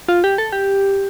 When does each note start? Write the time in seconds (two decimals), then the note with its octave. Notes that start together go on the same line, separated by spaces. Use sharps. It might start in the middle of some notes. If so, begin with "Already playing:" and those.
0.08 F4
0.24 G4
0.38 A4
0.52 G4